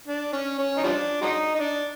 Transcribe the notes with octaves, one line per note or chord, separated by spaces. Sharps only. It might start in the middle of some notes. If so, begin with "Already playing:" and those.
D4
C#4
C#4
D#4
F3 G3 D4
F#3 G#3 D#4
D#4
D4